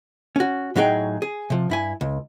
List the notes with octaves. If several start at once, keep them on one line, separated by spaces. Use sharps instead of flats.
C#4 F#4
A2 F#3 D#4 G#4 G5
G#4
C3 F3
G2 E4 G#5
C#2